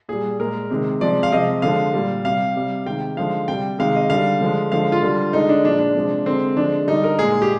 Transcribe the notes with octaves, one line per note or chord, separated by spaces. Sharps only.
A#2 G3 G#4
A#2 G#3 A#4
C3 D#3 G#3
C3 F3 G#3 D5
F5
C3 F3 G#3 D#5
D3 F3 G#3 F5
A#2 G3
C3 G3 F5
C3 G3
C3 D#3 G#3 G5
D3 F3 G#3 F5
C3 G3 G5
C3 D#3 G#3 F5
D#5
D3 G3 F5
D3 F3 G#3
D3 F3 G#3 F5
F4
D3 G3
D3 G#3 D#4
D4
A#2 F3 G#3 D4
D4
C3 F3 G#3
D3 G#3 C4
D3 F3 G#3 D4
D3 G3 D#4
A#4
A#2 G#3 G#4
G4